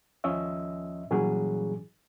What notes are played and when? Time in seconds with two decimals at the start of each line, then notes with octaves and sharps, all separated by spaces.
0.24 D#2 F3 C#4 D#5 E5 E6
1.10 A#2 E3 F#3 G3 C#4 G#4